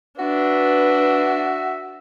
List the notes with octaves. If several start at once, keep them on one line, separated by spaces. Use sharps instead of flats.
D4 F#4 B4 E5